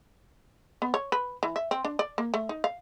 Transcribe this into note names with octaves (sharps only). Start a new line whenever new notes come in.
B3
C#5
B4
E3
E5
C4
D4
D5
A#3
A3
D#4
F5